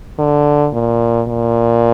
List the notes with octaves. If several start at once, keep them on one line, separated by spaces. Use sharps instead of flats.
D3
A#2
A#2